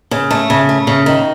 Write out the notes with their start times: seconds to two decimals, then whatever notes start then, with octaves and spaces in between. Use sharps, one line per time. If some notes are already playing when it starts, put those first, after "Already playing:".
0.11 C#3
0.31 A3
0.50 C#3
0.69 A3
0.87 C#3
1.06 D#3